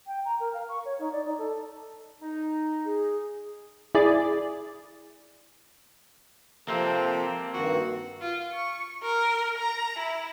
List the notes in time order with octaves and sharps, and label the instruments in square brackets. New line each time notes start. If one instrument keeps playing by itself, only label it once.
[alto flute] G5
A#5
A#4
F5
C#6
C#5
D#4
D5
D#4
A4
[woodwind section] D#4
[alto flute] G#4
[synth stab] E4 G#4 D5
[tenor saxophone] C3 [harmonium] F3 A4 [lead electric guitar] A#3 C4
[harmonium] G2 D#3 [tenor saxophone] F#4
[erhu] F4
C#6
A#4
A#5
E4